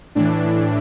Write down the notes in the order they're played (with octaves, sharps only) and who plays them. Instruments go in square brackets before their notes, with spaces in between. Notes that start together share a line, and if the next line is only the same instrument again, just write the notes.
[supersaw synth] A2 E3 D4